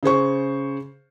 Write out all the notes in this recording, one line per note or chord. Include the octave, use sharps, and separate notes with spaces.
C#3 G#4 C5 C#6